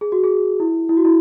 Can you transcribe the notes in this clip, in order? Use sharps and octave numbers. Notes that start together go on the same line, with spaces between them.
G#4
F#4
G#4
E4
E4
F#4
E4